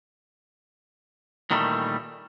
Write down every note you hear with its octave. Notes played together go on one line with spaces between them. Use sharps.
A#2 D#3 E3 G3 A3